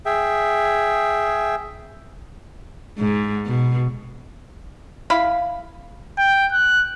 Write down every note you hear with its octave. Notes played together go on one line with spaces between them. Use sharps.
G#4 E5 G5
G#2
B2
E4 F5 B5
G5
F#6